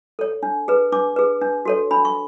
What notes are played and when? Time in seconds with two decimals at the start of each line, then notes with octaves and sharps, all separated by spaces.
0.19 A4 C#5
0.43 D4
0.68 G#4 B4
0.92 D4 D6
1.16 G#4 B4
1.41 D4
1.65 F#4 A4 C#5
1.91 D4 B5
2.05 C#6